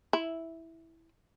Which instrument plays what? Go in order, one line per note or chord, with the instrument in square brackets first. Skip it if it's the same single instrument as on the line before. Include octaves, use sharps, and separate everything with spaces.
[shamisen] E4